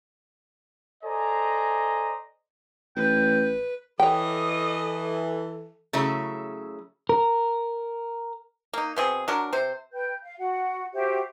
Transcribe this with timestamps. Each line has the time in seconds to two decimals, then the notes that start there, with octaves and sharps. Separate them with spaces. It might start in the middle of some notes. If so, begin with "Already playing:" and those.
1.04 A4 C5 D5 D#5 G#5 A#5
2.96 A1 B4 G5
4.00 E3 A4 C#5 D#5 G5
5.93 C#3 F#3 A3 E4
7.09 A#4
8.73 A#3 D#4
8.96 B2 C4 G#4
9.28 F#3 D4 A#4
9.53 C3 C5
9.93 B4 G5 G6
10.23 F5
10.38 F#4 F#5
10.94 F#4 G4 C5 E5